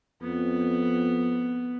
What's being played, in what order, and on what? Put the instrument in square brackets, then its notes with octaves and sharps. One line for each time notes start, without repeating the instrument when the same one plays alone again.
[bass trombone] F2 [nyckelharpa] B3